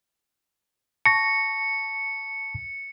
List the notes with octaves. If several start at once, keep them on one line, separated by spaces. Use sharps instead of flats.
A5 C#6 A#6 C#7